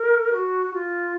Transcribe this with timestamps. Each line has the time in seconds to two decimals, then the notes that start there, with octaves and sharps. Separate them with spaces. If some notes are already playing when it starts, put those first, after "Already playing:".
Already playing: A#4
0.33 F#4
0.73 F4